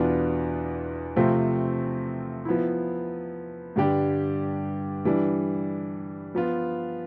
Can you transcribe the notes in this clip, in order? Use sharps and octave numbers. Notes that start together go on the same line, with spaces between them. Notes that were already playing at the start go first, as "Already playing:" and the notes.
Already playing: E2 B2 B3 D4 F4
C3 F3 A3 C4 F4
F3 B3 E4
G2 D3 G3 D4 G4
E3 G3 D4
F3 B3 F4